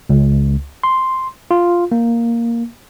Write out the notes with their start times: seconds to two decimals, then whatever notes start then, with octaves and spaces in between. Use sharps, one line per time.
0.09 C#2
0.83 C6
1.51 F4
1.92 A#3